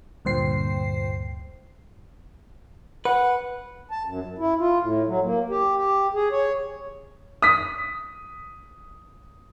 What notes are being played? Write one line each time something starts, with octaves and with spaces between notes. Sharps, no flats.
D2 G2 A#2 C5 G5 C7
B4 F#5
A5
F#2
F#2
E4
F4
A2
F#3
A#3
G4
G4
G#4
C#5
D#6 B6